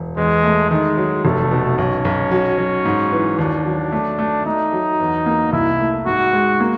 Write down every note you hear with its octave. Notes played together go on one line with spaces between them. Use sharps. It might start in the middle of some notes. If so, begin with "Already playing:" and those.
Already playing: E1
E2 G#3
A3
D#3 G#3
F#3
F1 A3
B2
B1 C#4
B1
F#3
F#3
G#2
E3
D#2 D4
F#3
A3
A3
A3 D#4
F#3
E2
A#3
C2 E4
A3
G#2 F#4
G#3
A#3